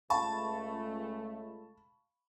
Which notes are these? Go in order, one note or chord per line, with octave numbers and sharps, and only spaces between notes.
C#2 A3 F5 A5 B5 C#6